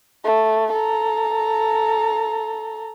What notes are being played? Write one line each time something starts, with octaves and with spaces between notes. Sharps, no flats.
A3
A4 A#5